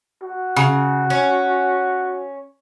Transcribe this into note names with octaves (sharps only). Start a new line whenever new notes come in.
F#4
C#3
C#4